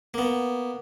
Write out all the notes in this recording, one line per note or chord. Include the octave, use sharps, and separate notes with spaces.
A#3 B3